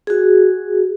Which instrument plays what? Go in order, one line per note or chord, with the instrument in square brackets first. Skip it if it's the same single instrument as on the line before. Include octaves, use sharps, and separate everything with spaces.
[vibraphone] F#4 G#4